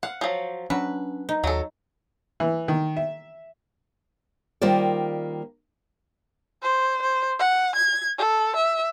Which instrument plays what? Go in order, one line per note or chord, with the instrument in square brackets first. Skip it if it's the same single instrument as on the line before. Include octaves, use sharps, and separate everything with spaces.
[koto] F5 [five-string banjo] F#5
[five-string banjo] F3 F#3
[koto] F#3 [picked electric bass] C#4 D4 [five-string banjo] B4
[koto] D#4
[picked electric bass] D#2 [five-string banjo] F#3 A4
[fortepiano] E3
D#3
E5
[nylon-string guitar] D#3 G3 A#3 F4 C5 D5
[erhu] C5
C5
F#5
G#6
A4
E5